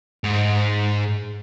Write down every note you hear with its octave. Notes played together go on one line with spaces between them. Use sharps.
G#2